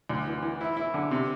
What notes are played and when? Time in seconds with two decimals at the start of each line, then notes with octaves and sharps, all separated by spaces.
0.09 D2
0.27 E3
0.43 E3
0.61 E4
0.77 E4
0.94 D3
1.11 C3